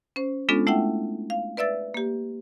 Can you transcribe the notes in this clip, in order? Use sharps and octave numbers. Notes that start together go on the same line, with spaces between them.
C#4 C5
G#3 B3 C#4 D4 F4 A4
A3 E4 E5 F#5 G5
F5
B4 D5 E5 E6 A6
A#3 G4